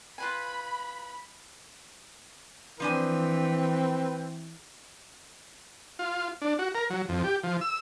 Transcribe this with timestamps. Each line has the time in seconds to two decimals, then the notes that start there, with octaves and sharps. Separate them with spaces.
0.18 F4 B4 G#5 B5
2.80 E3 F3 C4 D4 B4 G#5
5.99 F4
6.42 D4
6.59 F#4
6.75 A#4
6.90 F#3
7.09 F2
7.24 G4
7.43 F3
7.61 E6